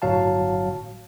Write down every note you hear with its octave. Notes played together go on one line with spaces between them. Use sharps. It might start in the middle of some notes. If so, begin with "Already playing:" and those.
G1 A2 F#3 F5 A5